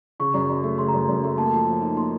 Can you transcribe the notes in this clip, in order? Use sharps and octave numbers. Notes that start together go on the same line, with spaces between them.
C#3 C#6
F#2
F#2
A3
C#3 C6
A#5
F#2
C6
F#2
A3
A#3 A5
F3
F3
D#4
A#3 C6